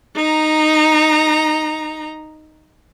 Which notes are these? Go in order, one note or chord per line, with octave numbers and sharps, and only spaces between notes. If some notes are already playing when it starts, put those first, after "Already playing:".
D#4 A#5